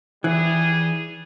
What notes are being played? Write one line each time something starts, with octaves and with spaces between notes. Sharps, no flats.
E3 G3 G#4